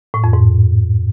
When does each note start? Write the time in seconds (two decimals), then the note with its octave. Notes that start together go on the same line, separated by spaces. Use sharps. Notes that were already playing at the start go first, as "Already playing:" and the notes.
0.14 A2
0.24 F2
0.33 G#2